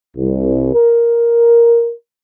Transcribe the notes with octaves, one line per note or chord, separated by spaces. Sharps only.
C2
A#4